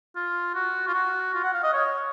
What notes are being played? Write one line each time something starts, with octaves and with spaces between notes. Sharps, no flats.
F4
F#4
F4
F#4
F4
F#5
F5
D#5
C#5